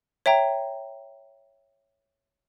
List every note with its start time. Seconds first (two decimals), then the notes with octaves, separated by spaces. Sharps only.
0.26 C#5 E5 G5 A#5